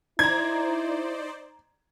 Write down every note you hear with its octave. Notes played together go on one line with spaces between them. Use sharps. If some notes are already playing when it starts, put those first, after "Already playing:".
D#4 E4 C5 D5 A#5 G#6